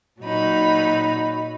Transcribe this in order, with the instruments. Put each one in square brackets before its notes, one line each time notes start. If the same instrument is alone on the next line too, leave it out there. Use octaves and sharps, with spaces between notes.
[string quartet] A#2 F#3 D#4 B5